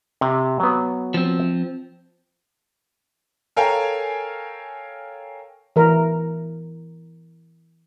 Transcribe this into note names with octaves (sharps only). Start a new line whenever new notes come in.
C3
F#3 B3
F3 C4
A4 A#4 C#5 F5 G5 G#5
E3 A#4